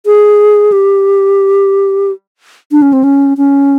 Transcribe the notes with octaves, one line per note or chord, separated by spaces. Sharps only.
G#4
G4
D4
C#4
C4
C#4
C#4